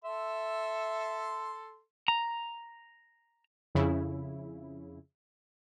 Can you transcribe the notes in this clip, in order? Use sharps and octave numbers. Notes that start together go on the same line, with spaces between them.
A4 E5 C6
A#5
F2 C#3 E4